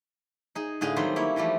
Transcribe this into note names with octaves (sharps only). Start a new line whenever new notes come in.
D#4 G#4
A2 D3 G#4 F5 G5
D#3 F#3 G3 C4 C5
A#3 E4 C#5
E3 F3 G3 A3